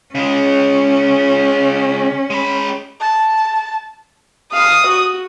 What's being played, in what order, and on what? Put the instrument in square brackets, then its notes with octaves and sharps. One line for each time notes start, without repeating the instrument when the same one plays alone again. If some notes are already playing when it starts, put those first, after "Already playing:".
[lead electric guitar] C#3 G#3 [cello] C#4
[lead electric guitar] G#3 B5
[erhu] A5
[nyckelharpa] F5 [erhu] D#6
[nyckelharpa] F#4